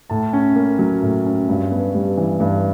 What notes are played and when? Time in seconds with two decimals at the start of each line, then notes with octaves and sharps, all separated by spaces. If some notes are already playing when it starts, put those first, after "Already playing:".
0.10 A2 A5
0.33 C#4
0.56 A#3
0.79 F#3
1.02 A2
1.26 C#4
1.49 G2
1.71 B3
1.94 G3
2.17 E3
2.40 G2